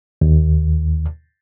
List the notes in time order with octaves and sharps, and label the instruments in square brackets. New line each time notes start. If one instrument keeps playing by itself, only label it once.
[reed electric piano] D#2